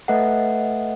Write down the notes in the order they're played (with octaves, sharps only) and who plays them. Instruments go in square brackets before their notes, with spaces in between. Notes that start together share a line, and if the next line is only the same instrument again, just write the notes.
[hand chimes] A3 A4 B4 D#5 E5 F#5